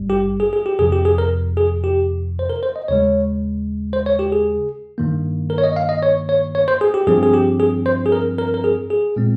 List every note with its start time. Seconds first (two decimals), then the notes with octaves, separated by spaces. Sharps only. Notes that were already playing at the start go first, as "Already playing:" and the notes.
Already playing: G#1 G2 G3
0.10 G4
0.40 G#4
0.53 G#4
0.66 G4
0.79 F2 C3 F3 G#4
0.92 G4
1.05 G#4
1.18 A#4
1.57 G#4
1.84 G4
2.39 C5
2.50 A#4
2.63 C5
2.76 D#5
2.88 D#2 C#3 G#3 C#5
3.93 C5
4.06 C#5
4.19 G4
4.32 G#4
4.98 G2 D#3 A#3
5.50 A#4
5.58 C#5
5.63 D#5
5.76 F5
5.89 D#5
6.03 C#5
6.29 C#5
6.55 C#5
6.68 C5
6.81 G#4
6.94 G4
7.07 G2 F3 C4 G#4
7.23 G#4
7.34 G4
7.60 G#4
7.86 C5
8.06 G#4
8.12 A#4
8.38 A#4
8.54 A#4
8.64 G#4
8.90 G#4
9.16 A#2 G#3 C4